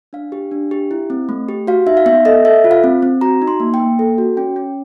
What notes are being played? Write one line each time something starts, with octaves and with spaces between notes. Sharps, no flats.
D4 F5
G4
D4
G4
E4
C4
A3
G4
F#4 F5
D#4 E5
F5
B3 E5
A4 D#5
A4 E5
F4
F5
C4
C4
F#4 A#5
D#4
C6
A#3
G5
A#3
A4
F#4
C#4 G5
C#4